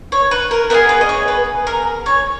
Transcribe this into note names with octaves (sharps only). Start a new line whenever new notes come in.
C#5
B4
A#4
B3 E4 G#4 A#4
B4
D#5
C#5
B4
A#4
C#5